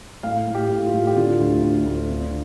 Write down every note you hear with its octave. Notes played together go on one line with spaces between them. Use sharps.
A2 F5
A2
G4
A2
F4
A2
G4
D3 F4
D2
D2
D2
D3